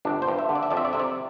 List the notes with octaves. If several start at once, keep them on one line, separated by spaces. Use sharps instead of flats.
G1 D4
C5
G2
E5
D3
D5
E5
F2 D5
E5
D5
C3 E5
D5